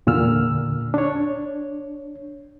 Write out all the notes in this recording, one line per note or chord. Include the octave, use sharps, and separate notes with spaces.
E2 A#2 D3 E6 F6
D4 C#5